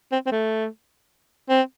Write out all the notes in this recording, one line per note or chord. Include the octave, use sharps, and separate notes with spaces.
C4
C4
A3
C4